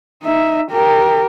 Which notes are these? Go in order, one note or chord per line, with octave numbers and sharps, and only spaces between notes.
D#4 E5
G4 A#4